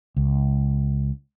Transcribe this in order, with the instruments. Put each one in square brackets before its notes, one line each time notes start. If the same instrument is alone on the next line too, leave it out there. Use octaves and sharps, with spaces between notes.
[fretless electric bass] C#2